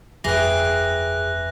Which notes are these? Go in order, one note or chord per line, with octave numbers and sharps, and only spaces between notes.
G1 F2 E3 G#4 G5 F#6 A#6